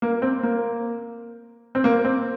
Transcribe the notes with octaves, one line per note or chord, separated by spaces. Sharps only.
A#3
C4
A#3
C4
A#3
C4